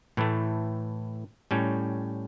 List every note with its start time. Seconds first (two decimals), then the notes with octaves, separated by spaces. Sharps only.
0.17 A2 E3 A3
1.51 A2 G3 C#4